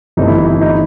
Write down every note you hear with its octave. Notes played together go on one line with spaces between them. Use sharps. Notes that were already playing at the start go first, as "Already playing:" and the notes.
G1 G2 E3 A3 C4 D#4
E4
D#4
E4
D#4